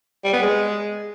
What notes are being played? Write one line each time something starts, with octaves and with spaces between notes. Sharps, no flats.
G3
B3
G#3